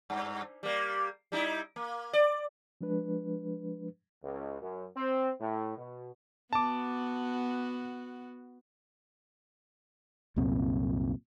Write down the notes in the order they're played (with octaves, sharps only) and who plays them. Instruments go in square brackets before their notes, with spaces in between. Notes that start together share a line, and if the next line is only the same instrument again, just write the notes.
[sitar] G2
G3 A#3
G3 D#4 E4
A#3
D5
[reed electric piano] F3 G#3 D4 B4
[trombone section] C#2
F#2
C4
A2
B2
[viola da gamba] B3 F#4 [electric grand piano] A5 D6
[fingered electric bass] C2 F#2 A#2 C4